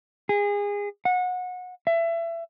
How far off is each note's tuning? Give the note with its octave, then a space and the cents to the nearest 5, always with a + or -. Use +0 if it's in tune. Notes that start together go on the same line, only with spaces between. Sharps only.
G#4 -25
F#5 -25
E5 +25